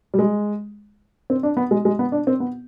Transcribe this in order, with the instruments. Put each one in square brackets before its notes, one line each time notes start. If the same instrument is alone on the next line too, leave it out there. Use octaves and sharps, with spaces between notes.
[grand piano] G3
G#3
C4
D4
B3
G#3
G#3
B3
D4
C4
B3